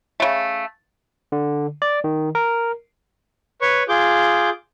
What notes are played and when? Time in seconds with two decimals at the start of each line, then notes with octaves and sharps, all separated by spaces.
0.20 C#3 A3
1.32 D3
1.82 D5
2.04 D#3
2.35 A#4
3.61 B4 C#5 C#6
3.89 F4 G#4 D6 G6